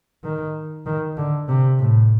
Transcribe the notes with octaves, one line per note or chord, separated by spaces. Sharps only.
D#3
D#3
D3
C3
A2